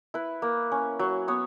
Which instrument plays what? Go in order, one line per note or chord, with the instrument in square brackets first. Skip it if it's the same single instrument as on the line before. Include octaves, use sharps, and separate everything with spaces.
[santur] E4 B4
A#3
C#4
F#3
B3 C#5